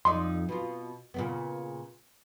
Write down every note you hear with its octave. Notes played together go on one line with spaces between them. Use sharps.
F2 D#4 D5 C6
B2 F4
A#2 C#3 B3